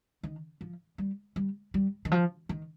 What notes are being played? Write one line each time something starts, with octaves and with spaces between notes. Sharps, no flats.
D#3
F3
G3
G3
G3
D#3
F3
D#3